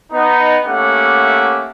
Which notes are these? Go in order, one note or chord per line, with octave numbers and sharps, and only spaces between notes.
B3 D#4
A3 A#3 C#4 G4 E5 F#5